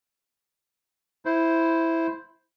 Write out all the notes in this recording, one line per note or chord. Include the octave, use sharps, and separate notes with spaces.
E4 C5